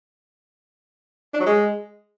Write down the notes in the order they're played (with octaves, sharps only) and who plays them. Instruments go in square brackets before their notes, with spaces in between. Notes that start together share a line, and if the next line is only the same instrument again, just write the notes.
[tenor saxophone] D4
F#3
G#3